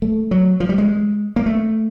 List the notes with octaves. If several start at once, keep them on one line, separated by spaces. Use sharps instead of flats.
A3
F#3
F3
G3
G#3
A#3
A3